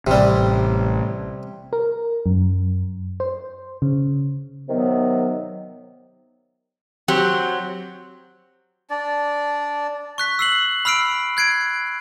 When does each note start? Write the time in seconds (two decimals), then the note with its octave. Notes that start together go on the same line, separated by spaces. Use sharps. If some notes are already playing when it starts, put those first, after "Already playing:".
0.07 A1 C3 G3
1.73 A#4
2.26 F#2
3.20 C5
3.82 C#3
4.69 C3 D#3 F#3 B3
7.08 F#3 C4 G4
8.90 D4 D5
10.18 C#6 F#6 B6
10.39 E6 C7 F#7
10.85 B5 E6 F6 C7 D7
11.37 F#6 G#6 C7 D7